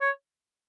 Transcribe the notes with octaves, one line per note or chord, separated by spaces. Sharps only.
C#5